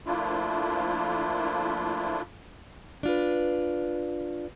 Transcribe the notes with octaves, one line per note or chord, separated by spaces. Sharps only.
F3 A3 A#3 D4 E4 F4
D4 F4 B4